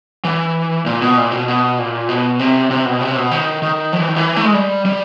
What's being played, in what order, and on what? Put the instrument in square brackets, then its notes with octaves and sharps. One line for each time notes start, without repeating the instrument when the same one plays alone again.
[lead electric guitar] E3
A#2
B2
A#2
B2
B2
A#2
B2
C3
C3
B2
C3
B2
D#3
D#3
F3
E3
D#3
E3
A3
G#3
G3
G3